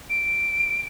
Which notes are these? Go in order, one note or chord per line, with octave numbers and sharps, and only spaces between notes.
D7